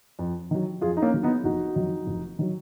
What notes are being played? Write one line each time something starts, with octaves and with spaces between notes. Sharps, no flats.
F2
D#3 F#3
F2 F4 G#4
D#4
A#3 C#4
D#3 F#3
B3 D#4
F1 D#4 F#4
F2 D#3 F#3
F1
D#3 F#3